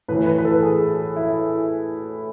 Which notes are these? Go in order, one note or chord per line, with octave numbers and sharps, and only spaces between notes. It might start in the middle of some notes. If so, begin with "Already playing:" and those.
A2 E3 B4
B4
B4
A4
G#4
E4